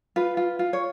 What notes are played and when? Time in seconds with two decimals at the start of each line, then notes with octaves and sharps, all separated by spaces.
0.16 F4 B4
0.37 F4
0.59 F4
0.73 C#5